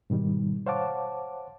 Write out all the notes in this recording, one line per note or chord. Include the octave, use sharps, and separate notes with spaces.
G#2 B2 D#3 G3
C5 C#5 F5 F#5 A5 D6